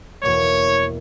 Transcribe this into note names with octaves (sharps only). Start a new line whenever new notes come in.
E2 B2 A#3 C#5